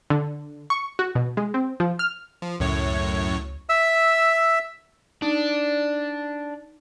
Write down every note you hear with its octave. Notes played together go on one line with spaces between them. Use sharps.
D3
C#6
F#4
B2
G#3
C4
F3
F6
F3
C#2 F#2 A2 C#5
E5 E6
D4 D#4